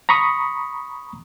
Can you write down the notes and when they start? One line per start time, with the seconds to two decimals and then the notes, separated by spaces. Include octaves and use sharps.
0.09 A#5 B5 C#6 D#6